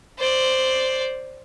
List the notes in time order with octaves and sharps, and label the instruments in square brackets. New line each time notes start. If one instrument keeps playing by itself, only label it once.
[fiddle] C5 D5